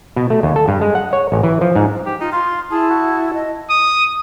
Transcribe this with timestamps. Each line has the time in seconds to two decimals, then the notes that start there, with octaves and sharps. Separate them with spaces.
0.16 B2
0.30 A3
0.43 D#2
0.56 A4
0.68 G2
0.81 G#3
0.95 F#5
1.13 C#5
1.32 A1
1.43 E3
1.61 F3
1.76 G#2
2.06 G4
2.21 D#4 F4
2.32 F4 C6
2.71 E4 G#4 A5
2.89 F#4
3.34 D#5
3.70 D#6